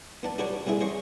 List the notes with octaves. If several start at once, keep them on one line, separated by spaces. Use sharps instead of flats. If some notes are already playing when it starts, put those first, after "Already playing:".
B3 D4 A5
D4 F#4 G4 B4 C#5 D5
G3 B3 C4 E4 G#4
C5 C#5 D#5 C#6